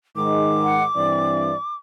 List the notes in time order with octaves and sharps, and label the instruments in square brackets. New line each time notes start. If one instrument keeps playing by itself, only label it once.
[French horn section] G#2 D#3 G#3 [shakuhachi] D6
[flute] F#5
[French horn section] G2 E3 C4 [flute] D5